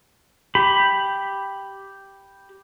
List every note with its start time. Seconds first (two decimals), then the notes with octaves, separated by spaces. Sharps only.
0.55 G4 B5